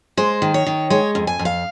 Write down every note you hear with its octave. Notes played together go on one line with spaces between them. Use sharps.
G#3 C5
D#3
C#5
D#3
G#3 C#5
F2
G#5
F2
F5